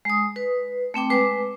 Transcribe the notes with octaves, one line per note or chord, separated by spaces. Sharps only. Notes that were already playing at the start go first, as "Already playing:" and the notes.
G#3 D#6
B4
A3 C4 G5 D6
G#3 B4 D6